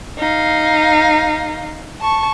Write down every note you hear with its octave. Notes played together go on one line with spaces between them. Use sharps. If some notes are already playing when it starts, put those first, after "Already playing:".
D#4 F5
A5 C#6